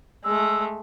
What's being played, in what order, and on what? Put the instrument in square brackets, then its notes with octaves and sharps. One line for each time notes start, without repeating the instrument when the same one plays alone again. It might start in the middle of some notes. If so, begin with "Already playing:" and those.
[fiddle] G#3 A3 [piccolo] E6